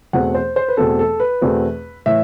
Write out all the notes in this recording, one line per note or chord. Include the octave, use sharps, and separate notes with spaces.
E2 B2 A3 C4 F#5
C5
C5
B4
E2 B2 A3 C4 A4
A4
B4
E2 B2 A3 C4
A2 E3 E5